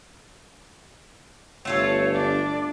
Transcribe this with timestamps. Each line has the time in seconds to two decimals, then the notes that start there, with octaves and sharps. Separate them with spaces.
1.65 G1 A3 F4 A4 C#5
2.13 D4 D5